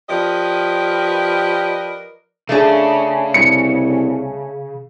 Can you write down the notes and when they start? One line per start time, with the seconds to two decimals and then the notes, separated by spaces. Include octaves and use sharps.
0.10 F3 G4 A#4 B4 D5 D#5
2.49 C#3 A3 D4 G#4
3.34 C2 C#7